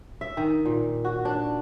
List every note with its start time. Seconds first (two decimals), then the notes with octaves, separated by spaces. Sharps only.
0.21 E5
0.37 D#3
0.66 A#2
1.05 F#4
1.25 D4